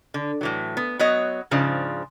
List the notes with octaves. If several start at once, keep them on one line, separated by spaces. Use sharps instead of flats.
D3
A2 E3 F#3
B3
F#3 B3 C#5 D#5
G#2 C#3 F3 D4